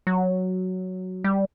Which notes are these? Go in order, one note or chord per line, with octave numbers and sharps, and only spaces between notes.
F#3
G3